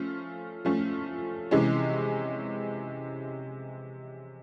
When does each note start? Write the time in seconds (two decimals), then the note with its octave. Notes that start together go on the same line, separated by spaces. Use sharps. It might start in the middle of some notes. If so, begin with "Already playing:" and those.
Already playing: F3 A3 C#4 F4
0.65 F3 A3 C#4 F4
1.51 C3 E3 G#3 C#4